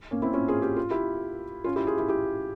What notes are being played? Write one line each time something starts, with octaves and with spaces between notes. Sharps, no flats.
A#3 C#4
C4 E4
C#4 F4
F4 G#4
G4
F4
E4 G4
C#4 F4
E4 G4
F4 G#4
E4 G4
E4 G4